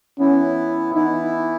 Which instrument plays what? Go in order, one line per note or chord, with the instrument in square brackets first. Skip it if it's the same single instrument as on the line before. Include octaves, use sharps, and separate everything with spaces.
[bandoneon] E3 B3 E4 [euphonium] C#4
[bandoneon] E3 B3 E4 [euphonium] D#4